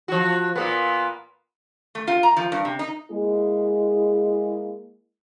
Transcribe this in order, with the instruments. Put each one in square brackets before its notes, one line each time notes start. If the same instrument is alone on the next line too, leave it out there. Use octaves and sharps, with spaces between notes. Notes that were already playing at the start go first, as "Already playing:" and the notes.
[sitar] F3 F#4
A#2 A#3 B3
[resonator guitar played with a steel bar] A3
F4
A#5
F3
G2
C3
D#4
[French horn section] G#3 A#3 E4 G#4